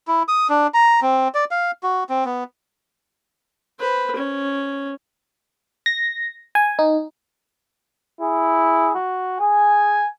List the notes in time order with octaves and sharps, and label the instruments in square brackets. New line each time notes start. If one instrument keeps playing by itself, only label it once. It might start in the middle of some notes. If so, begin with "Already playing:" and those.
[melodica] E4
D#6
D4
A#5
C4
D5
F5
F#4
C4
B3
[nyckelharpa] B4 C5
C#4
[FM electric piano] A#6
G#5
D#4
[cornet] E4 [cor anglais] G#4
[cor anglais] F#4
[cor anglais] G#4 [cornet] G#5